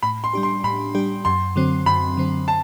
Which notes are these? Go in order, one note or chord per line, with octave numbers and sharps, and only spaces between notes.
A2 B5
C6
G3 D4 G4
C6
A2 B5
G3 D4 G4
F#2 C6
D3 F#3 C4
F#2 B5
D3 F#3 C4
A5